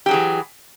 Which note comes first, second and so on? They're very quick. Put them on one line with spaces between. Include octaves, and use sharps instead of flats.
G4 F#3 G#4 E3